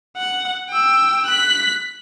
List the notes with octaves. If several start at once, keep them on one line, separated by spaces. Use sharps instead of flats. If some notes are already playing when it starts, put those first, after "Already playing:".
F#5
G5 E6
F#6 B6